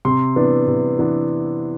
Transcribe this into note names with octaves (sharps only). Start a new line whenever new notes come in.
C3 C6
E3 B3 D4
C3
E3 B3 D4